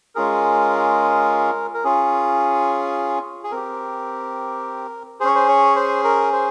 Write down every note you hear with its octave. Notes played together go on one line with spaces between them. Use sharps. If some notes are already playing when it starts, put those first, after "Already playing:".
G#3 C#4 F4 G#4 A#4
A#4
C#4 F4 G#4
G#4
C4 G4 A#4
C#4 G#4 C5 C#5
C5
C#5
C5
A#4
C5